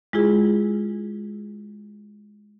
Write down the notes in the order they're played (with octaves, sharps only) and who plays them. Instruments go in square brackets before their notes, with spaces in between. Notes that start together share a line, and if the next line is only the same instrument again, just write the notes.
[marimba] G#3 E4 F4 G#4